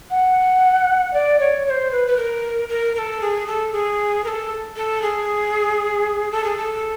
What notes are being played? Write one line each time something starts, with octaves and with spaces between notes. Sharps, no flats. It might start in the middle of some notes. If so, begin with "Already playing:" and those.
F#5
D5
C#5
C#5
C5
B4
B4
A#4
A#4
A#4
A4
G#4
A4
G#4
A#4
A4
A4
G#4
A4
G#4
A4